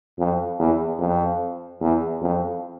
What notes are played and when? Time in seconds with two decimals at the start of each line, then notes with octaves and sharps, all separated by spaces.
0.19 F2
0.59 E2
0.99 F2
1.81 E2
2.21 F2